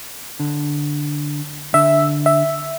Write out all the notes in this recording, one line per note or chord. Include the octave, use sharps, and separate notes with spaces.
D3
D3 E5
E5